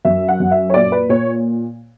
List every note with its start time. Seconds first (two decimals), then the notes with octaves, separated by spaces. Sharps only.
0.05 F#2 E5
0.28 F#5
0.40 F#2
0.51 E5
0.70 C#5
0.74 A#2 D5
0.92 B4
1.09 A#2 C#5